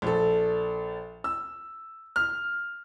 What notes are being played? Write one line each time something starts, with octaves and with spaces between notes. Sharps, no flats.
A#1 A4
E6
F6